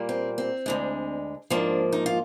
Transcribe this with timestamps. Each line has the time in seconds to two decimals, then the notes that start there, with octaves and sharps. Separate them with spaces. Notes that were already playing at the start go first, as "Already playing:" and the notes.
Already playing: A#2 G3 A#3
0.09 C4
0.38 C4
0.66 D2 D3 G#3
1.50 G#2 F3 A#3 D4
1.93 D#4
2.06 F4